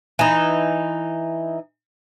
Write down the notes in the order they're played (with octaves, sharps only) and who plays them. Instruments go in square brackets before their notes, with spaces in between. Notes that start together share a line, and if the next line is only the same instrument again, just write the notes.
[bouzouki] E3 D#4